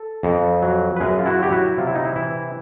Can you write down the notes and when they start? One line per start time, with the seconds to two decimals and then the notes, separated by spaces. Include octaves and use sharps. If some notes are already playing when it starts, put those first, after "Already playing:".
Already playing: A4
0.23 F2
0.62 F#3
0.96 B4
1.00 F#2 G#4 A#4
1.19 F4
1.26 E4 F#4
1.39 F#3 G4
1.52 E4 F#4
1.78 C3 F4
1.87 E4
1.95 D#4
2.05 E4
2.16 E3 E4